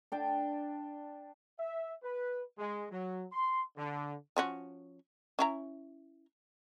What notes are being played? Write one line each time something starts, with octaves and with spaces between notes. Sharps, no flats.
D4 G5 A5
E5
B4
G#3
F#3
C6
D3
F3 C#4 F#4
C#4 E4 A#5